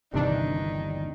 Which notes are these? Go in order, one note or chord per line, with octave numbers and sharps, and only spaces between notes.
G1 D#2 C3 D#3 E3 D4